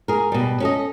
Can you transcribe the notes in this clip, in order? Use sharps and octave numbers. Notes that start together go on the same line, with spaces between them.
G#4 A#4
B2 G3
C#4 A4 D#5